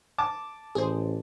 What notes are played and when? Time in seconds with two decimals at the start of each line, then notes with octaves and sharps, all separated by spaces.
0.18 A5 D6
0.75 A1 G#4 C5